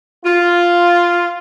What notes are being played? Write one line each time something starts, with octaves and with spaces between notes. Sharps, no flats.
F4